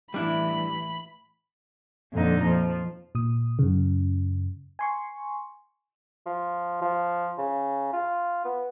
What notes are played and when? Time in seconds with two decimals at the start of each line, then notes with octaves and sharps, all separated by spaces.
0.14 A2 E3 G3 D4 E4 B5
2.12 F2 A#2 D3 D#4
2.42 F3
3.15 A#2 D#6
3.59 F#2 C#3
4.79 G#5 C6 C#6
6.26 F3
6.81 F3
7.38 C#3
7.93 F4
8.45 B3